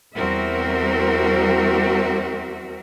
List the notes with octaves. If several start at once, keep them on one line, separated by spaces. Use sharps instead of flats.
E2 G3 C4 F#4 A#4 E5